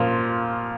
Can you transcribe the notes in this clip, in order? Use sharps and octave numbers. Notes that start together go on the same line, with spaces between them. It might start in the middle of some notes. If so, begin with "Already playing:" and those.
Already playing: A#2 F3